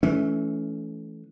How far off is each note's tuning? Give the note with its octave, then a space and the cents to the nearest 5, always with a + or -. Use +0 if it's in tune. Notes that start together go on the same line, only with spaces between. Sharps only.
E3 +0 A3 -20 C#4 +25